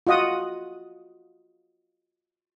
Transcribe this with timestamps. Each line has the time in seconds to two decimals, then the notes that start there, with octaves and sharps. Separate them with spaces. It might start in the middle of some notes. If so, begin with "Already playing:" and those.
0.07 F4 F#4 D#5 F#5 D#6